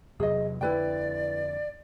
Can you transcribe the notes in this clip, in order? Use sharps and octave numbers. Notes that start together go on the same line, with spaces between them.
E2 C3 F#3 G#4 D#5
F2 D3 E4 B4 D5 G5